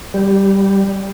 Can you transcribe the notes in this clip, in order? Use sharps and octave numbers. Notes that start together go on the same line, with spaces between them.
G3